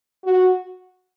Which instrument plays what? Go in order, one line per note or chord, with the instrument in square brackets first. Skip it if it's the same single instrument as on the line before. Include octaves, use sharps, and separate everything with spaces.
[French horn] F#4